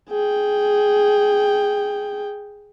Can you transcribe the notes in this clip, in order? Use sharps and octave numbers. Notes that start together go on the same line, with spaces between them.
G#4 G5